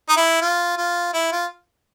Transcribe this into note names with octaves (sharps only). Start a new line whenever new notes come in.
D#4
E4
F4
F4
E4
F4